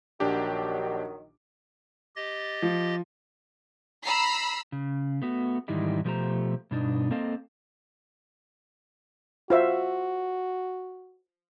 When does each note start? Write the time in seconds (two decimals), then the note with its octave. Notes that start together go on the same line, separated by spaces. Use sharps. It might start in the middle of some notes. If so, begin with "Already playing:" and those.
0.20 A#1 D#3 F#3 D4 G4
2.16 G4 D#5 A6
2.62 F3
4.04 A#5 B5 E6 B6 C7
4.72 C#3
5.22 A3 B3 F#4
5.68 G#2 D#3 E3 G3 D#4 E4
6.05 B2 F3 A3 G4 C5 A#5
6.71 G2 B2 D4 D#4
7.11 A#3 C4 A4 D#5 F5
9.50 F4 F#4 C5 E5